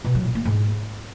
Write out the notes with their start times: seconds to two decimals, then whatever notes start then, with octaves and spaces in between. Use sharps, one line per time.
0.04 B2
0.15 F#3
0.25 A#2
0.35 A#3
0.45 G#2